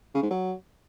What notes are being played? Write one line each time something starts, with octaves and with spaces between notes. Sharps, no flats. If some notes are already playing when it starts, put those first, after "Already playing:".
C#3
G#2
F#3